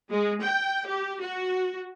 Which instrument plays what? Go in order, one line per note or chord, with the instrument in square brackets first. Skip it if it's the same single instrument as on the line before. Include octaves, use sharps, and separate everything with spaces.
[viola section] G#3
G5
G4
F#4